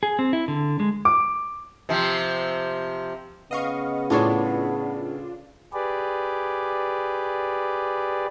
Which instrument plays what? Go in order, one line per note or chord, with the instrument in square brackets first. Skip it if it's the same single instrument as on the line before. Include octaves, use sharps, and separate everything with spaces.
[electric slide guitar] G#4
C4
E4
D3
G#3
[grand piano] D6
[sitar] C3 F3 C4
[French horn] C#3 [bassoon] B3 [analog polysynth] D#5 F5 C#6
[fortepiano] A2 G#4 C#5 [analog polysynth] D4 F4
[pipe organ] G4 G#4 B4 D5